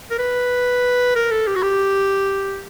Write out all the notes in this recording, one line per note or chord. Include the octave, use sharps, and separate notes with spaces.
A#4
B4
A#4
A4
G4
F#4
G4